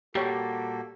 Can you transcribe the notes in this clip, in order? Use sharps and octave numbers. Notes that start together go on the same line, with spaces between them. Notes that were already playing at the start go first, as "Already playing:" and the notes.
A#2 G3 A#3 F#4 G4 A4 C#5